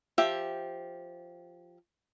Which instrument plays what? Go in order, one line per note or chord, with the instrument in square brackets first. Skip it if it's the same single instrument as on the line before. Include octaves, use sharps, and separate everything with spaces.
[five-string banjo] F3 G4 E5